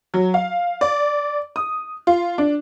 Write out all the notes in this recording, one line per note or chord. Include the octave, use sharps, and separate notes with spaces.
F#3
F5
D5
D#6
F4
D4